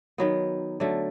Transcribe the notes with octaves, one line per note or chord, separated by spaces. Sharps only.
D#3 F#3 B3
D3 F#3 A3